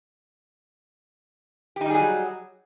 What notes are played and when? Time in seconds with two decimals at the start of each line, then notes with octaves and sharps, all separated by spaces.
1.76 G4
1.81 D#4
1.85 G3
1.90 G#4
1.95 F#3